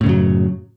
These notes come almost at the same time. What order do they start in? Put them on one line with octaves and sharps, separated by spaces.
A2 C#3 F#2 F#3